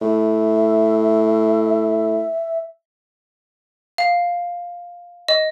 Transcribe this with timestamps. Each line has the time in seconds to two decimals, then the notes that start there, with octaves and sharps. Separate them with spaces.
0.01 A2 E5
3.98 F5
5.28 D#5